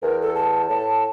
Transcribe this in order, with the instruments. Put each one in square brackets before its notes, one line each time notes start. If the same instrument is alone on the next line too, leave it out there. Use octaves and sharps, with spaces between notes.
[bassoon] E2 [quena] A#4
[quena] A4
A5
[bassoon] A2 [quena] A5